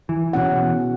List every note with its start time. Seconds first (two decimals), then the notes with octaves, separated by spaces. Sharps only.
0.09 E3
0.33 B2 C#4 F#5